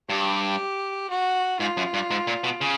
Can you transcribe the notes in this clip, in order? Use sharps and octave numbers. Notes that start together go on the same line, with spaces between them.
G2 G4
F#4
G#2 F4
F#2
G2
G#2
A#2
B2
C#3